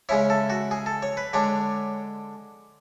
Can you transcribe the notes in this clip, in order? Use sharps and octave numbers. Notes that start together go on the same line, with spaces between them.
C#3 G#3 C#4 E4 C#5
A4
F#4
G#4
A4
C#5
B4
D3 G#3 D4 C#5